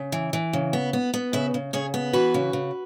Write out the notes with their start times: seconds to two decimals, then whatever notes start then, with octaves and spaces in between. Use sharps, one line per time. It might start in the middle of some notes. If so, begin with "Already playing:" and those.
Already playing: C#3
0.12 E3
0.33 E3
0.53 C#3
0.73 B3
0.93 B3
1.14 B3
1.33 C#3 B4 E5
1.54 C#3
1.73 C#3 G#4 C#5
1.94 B3
2.13 E3 F#4 B4
2.34 C#3
2.53 C#3